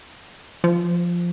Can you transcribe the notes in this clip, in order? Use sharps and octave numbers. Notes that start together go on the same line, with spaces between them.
F3